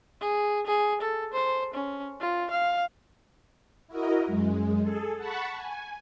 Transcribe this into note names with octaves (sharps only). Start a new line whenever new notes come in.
G#4
G#4
A4
C5
C#4
F4
F5
E4 F#4 A#4 D#5
F#2 G#3
G#4 A4
F#5 A5 B5 C#6
G#5